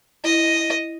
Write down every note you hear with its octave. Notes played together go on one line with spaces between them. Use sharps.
E4 D#5